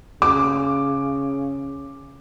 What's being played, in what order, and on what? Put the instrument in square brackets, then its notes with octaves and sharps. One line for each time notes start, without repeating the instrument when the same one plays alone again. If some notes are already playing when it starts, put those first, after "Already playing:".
[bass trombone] C#3 [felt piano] D6